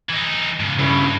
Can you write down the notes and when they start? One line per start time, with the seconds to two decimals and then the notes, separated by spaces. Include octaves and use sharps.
0.09 E3 D#4
0.60 G#2 C#3
0.79 G2 C#3 E4